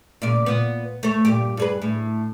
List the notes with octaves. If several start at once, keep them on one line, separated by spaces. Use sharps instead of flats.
A#2 C#3 D5
A#2 B3
A3 C#5
G2 A#2 G4
G2 G#4 B4
A2